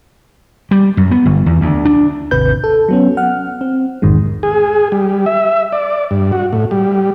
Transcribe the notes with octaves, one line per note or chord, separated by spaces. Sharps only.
G3
F#2
B3
G1
E2
D2
D4
G#1 D#2 C3 B4 G6
A4
F#3 B3 C#4
F#5 F6
C4
B1 E2 G#2 D#3 G#3
G#4
G3
E5
D5
G2
F#4
A2
G3